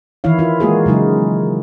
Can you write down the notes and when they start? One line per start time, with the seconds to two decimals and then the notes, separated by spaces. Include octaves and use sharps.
0.24 D#3 E3 E4 C#5 F5
0.39 E4 F4
0.60 G#3 A#3 F4 F#4 G#4
0.86 C#3 F#3 G#3 D#4